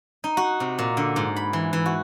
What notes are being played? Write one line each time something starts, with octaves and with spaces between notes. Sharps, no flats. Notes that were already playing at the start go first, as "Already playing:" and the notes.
D#4
F#4
C3
A#2
D3
G#2
B5
E3
E3
F#4